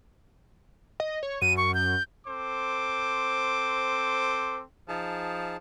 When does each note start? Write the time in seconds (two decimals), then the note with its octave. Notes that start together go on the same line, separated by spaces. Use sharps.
1.00 D#5
1.23 C#5
1.42 F#2 D#7
1.57 C#6
1.74 G6
2.27 C4 A4 C5 D6
4.88 F3 D#4 G#4 A5